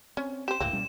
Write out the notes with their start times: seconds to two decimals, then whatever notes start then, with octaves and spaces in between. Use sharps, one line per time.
0.17 C4 C#4
0.48 G4 C5 E7
0.60 C#2 G#2 E3 A#3 C4
0.73 B2 G3 C#4